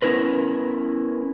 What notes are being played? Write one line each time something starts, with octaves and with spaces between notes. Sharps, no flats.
B3 C#4 E4 A#4 B4